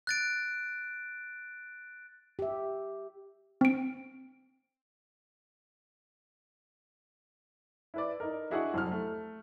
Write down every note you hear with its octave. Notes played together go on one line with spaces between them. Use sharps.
F#6 A6 D7
G4 E5
C4 D7
E4 B4 D5
D#4 A#4
D4 E4 F#4 G#4 D#5 F#5
C2 F2 F#3 F6
A3